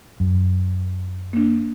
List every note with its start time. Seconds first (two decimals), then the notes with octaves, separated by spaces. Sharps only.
0.20 F#2
1.33 A#3 D4